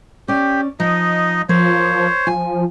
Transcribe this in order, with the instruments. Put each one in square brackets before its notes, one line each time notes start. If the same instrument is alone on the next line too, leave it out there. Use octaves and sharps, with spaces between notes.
[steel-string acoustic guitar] C#4 D5 [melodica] G4
[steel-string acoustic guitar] F3 [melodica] D#4 D#5
[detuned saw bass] F3 [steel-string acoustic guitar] A#4 [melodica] C5 C#5
[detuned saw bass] F3 [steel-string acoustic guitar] G#5